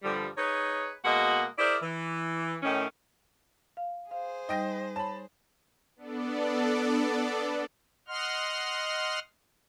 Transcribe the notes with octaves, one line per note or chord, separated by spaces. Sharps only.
G2 D3 F3 G3
D#4 G#4 B4 C#5
B2 G#3 A#3 F#4 D#5 F#5
E4 G#4 A#4 C5 D5
E3
A2 D#3 C#4
F5
G#4 C5 F5
G3 D#4 D#5 G5 A#6
C#5 A5 B5
B3 D4 A4 D5
D#5 F#5 C6 F6